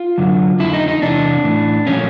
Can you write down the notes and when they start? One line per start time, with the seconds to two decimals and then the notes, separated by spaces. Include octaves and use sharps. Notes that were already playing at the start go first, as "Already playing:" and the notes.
Already playing: F4
0.18 F#2 D3 F#3
0.60 F2 D3 F3 E4
0.74 D#4
0.88 D#4
1.02 E2 C3 E3 D4
1.44 A2 E3
1.87 A#2 F3 C#4